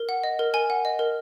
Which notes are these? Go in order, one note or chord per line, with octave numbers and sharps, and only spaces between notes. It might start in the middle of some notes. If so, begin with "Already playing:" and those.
Already playing: A#4
F#5
D#5
A#4
A#4 G#5
F#5
D#5
A#4